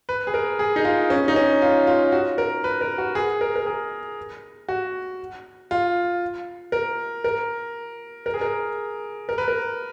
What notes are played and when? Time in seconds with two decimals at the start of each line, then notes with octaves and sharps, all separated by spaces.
0.09 B4
0.27 G#4
0.34 A#4
0.59 G#4
0.76 D#4
0.85 F4
1.10 C#4
1.28 D#4
1.36 C#4
1.62 F4
1.87 F4
2.12 F#4
2.38 A#4
2.64 B4
2.81 A#4
2.98 F#4
3.15 G#4
3.41 A#4
3.56 A#4
3.66 G#4
4.69 F#4
5.71 F4
6.72 A#4
7.24 A#4
8.26 A#4
8.34 G#4
8.41 A#4
9.29 A#4
9.38 B4
9.48 A#4